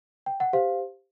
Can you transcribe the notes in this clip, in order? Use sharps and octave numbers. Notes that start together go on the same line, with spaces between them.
G5
F#5
G4 C5 F5